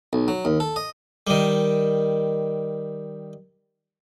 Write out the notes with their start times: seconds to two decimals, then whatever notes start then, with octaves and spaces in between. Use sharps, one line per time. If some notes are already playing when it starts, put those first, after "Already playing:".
0.13 B1
0.28 F#3
0.45 D#2
0.60 A4
0.76 D#5
1.27 D#3 G3